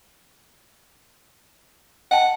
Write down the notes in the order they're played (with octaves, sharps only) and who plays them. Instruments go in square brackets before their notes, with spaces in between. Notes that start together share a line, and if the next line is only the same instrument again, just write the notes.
[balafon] D#5 G5 A5 [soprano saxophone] F#5